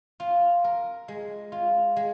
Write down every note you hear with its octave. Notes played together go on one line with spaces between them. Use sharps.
F4
A#4
G#3
F4
G#3